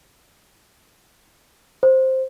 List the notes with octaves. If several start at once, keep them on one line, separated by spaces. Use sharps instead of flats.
C5